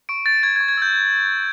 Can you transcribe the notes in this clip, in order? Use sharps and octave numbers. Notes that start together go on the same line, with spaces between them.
C#6 D7
G6 A6
C#6 G#6
G#6
C#6
G#6
E6 G6